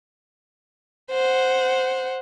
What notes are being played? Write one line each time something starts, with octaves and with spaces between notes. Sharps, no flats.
C5 F#5